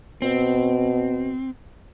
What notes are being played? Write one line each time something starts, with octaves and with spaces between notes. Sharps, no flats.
B2 C4